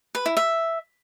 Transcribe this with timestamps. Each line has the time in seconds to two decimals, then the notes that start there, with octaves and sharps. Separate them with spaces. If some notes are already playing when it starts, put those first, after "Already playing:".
0.15 B4
0.26 E4
0.37 E5